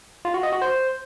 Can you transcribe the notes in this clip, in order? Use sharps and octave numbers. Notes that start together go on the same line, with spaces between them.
F4
F#4
D#5
F#4
C5